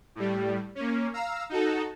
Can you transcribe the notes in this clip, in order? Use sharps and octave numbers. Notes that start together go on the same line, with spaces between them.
A2 G3
A#3 C#4
F5 A#5 E6
D#4 F#4 A4